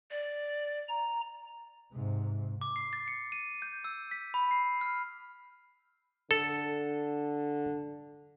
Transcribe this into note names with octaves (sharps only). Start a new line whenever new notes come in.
D5
A#5
G#2 C3
D6
C7
A6
C#7
D#7
G6
E6
B6
B5
C7
F6
D3 A4